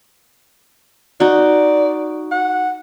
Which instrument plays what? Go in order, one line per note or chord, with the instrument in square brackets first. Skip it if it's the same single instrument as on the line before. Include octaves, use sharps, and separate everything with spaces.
[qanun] D#4 F#4 [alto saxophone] D5
[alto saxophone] F#5